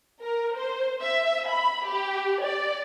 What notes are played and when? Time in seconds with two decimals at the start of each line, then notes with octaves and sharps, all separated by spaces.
0.21 A#4
0.56 C5
1.01 E5
1.48 B5
1.88 G4
2.44 D5